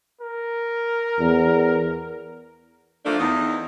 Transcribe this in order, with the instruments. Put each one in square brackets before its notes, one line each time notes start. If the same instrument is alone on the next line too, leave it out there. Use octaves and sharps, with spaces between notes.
[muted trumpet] A#4
[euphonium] E2
[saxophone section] F3 A3 A#3 D4
E2 D#4